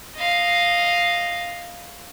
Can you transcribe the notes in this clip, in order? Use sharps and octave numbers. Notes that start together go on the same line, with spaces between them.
D#5 F5